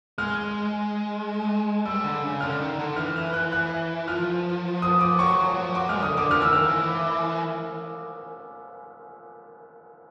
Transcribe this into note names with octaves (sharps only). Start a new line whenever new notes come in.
G#3 F6
G3 E6
D3
C#3
D3 F6
D#3
D3
E3 F6
F6
F#6
F#6
F3 F6
D#6
D6
F#3 C#6
F3
F#3
F3
F#3 D6
G#3 F6
D3 D#6
D3 D6
D3 F6
E3 E6
D#3 F6
E3